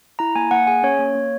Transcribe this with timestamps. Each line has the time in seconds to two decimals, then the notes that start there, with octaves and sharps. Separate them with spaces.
0.19 E4 A#5
0.35 A#3 G#5
0.51 A#3 F#5
0.67 G#4 G#5
0.83 C#4 C#5
0.99 A#3
1.15 A#3